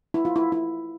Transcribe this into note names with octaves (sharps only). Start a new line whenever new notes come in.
E4
F4
E4
E4